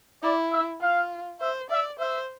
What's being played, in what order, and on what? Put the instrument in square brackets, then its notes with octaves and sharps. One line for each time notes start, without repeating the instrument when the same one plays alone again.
[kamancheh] E4 [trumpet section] D5
[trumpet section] E5
[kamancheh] F4 [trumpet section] F5
[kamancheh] C5 [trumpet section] E5
[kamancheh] D5 [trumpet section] E5
[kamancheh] C5 [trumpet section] E5